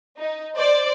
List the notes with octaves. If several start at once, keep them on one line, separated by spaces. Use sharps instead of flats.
D#4
C5 D5